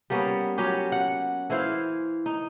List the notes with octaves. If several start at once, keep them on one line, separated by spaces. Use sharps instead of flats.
G3 A#3 B3 C#4
F#3 C#4 G4
F#5
E3 E4 C5 F5
D#4